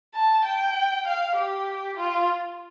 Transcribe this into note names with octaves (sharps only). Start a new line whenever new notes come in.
A5
G5
F5
G4
F4